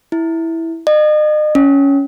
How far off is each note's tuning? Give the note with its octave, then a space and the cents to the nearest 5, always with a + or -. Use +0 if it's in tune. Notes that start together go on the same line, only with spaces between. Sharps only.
E4 -5
D#5 -40
C#4 +10